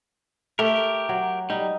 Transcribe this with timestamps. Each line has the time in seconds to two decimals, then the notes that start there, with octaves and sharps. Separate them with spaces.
0.59 A3 G4 A#4
1.09 F#3
1.50 G3 D#4